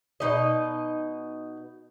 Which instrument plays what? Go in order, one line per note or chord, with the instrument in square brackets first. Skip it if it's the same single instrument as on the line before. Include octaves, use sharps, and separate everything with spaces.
[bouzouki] B2 D#4 D#5